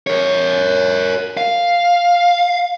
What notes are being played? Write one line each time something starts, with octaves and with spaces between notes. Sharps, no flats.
A#4 C#5
F5